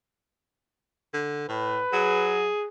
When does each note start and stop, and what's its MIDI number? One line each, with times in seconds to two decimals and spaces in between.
1.14 1.47 50
1.49 1.81 45
1.49 2.36 71
1.93 2.48 54
1.93 2.67 68